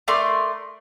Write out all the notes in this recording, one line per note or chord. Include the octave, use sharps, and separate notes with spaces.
A3 A#4 D5 C6